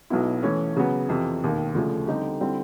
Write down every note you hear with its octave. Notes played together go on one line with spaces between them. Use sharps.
B1 B2 F#3 B3 E4
E3 A3 C#4
C#3 F#3 B3
F2 C3 E3
E1 D#2 D#3
D2 C#3 F3 A3
D3 G3 C4 D#4 G4
D3 G3 C4 E4